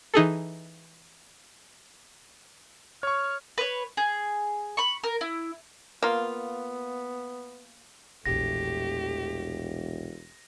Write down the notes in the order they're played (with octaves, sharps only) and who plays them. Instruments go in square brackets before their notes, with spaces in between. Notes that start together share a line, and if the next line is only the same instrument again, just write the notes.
[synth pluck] E3 D#4 G#4 A4
[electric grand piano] C#5 C#6 [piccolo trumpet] F6
[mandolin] B4 C#5
G#4
B5 C#6
A#4
E4
[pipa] A#3 F4 [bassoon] B3
[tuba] E1 [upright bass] A#1 E2 [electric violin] A3 G4 [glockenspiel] A#6